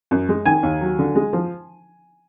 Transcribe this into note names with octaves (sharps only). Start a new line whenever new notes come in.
F#2
G#3
D#3 G#5
D#2
F#3
D3
G#3
F3